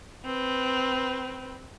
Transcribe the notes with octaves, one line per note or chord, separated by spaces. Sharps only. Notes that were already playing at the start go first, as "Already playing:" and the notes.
C4 B4